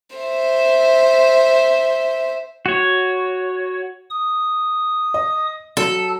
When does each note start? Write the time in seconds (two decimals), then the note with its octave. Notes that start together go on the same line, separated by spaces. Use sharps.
0.16 C5 E5
2.66 F#4 C#5
4.11 D#6
5.14 D#5
5.77 F#3 A4